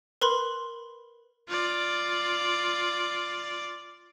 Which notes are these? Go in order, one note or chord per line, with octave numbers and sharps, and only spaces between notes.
A#4 B4 B5 C6
F4 D5